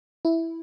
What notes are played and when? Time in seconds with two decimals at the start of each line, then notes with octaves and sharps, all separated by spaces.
0.25 E4